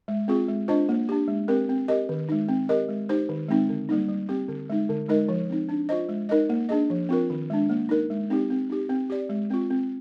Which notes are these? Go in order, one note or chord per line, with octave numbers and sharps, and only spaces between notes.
G#3
C4 F4 G#4
G#3
D4 F4 C5 D#5
A#3
D4 G4
G#3
C4 G4 A#4
C4
G4 A#4 D#5
D#3
G#3 D#4
C4
G4 A#4 D#5
G#3
D#4 G4 C5
D#3
G#3 C4 D#4
D3
G3 A#3 D#4
G3
C4 G4
D3
G#3 D#4
D3
G#3 D#4 A#4 D#5
F3
C4 D#4
D4
F4 C5 D#5
G#3
D#4 A#4 D#5
A#3
D4 G#4 D#5
F3
C4 F4 A#4
D#3
G#3 D4
A#3
D#4 A#4
G#3
C4 D#4 G4
C4
D#4 G4
C4
G4 D5
G#3
C4 F4
C4